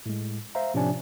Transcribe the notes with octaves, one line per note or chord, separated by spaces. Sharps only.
A2 G#3
C5 E5 F5 A#5
A2 C3 F3 C#4 D4 G#5